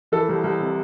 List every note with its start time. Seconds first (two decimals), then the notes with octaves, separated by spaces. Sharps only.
0.12 E3 A4
0.29 C2
0.44 C2
0.60 C3